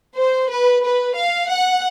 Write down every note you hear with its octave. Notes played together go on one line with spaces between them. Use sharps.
C5
B4
B4
F5
F#5